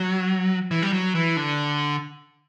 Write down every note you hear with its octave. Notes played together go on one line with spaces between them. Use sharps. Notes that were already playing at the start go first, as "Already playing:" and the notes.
Already playing: F#3
E3
G3
F#3
E3
D3